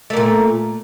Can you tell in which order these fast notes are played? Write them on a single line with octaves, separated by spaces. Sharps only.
A3 A#3 A#2